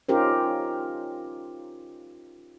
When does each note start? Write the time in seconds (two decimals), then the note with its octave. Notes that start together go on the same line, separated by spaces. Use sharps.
0.09 C#4 D#4 F4 G4 A#4 C5